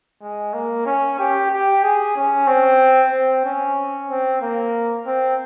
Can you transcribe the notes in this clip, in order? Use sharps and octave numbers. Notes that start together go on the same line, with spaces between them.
G#3
A#3
C#4
G4
G4
G#4
C#4
C4
C4
C#4
C4
A#3
C4